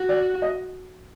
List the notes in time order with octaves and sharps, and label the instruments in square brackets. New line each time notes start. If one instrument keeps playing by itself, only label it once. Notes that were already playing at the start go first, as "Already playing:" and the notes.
Already playing: [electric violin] F#4
[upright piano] D5
D#5